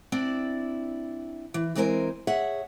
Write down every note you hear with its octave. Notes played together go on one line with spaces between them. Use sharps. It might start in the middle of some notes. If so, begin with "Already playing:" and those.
C4 D4 E4 D5
E3
E3 G#3 C4 A#4 C5 G#5
G#4 C#5 E5 F#5